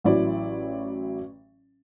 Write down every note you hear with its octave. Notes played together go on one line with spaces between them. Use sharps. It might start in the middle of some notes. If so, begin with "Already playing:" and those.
A1 F#3 E4 D5